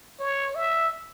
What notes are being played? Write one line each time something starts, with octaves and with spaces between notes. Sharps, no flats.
C#5
E5